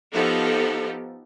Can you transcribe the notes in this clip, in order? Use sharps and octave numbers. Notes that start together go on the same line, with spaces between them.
F3 B3 D#4 G4 A4